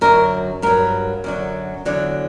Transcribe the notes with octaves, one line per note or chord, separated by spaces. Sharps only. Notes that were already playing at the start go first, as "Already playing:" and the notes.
F#2 D3 F#3 A#4
G2 F#3 A#4
F#2 D3 F#3
E2 D3 F#3